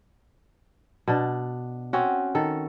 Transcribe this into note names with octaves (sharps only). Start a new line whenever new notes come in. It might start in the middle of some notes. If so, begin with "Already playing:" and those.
B2 D4
C4 C#4 F#4
D#3 A4